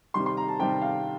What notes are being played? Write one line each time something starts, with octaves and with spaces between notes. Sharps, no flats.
C3 D#3 G3 C6
C6
A#5
A5
C3 D#3 G3 G5
F5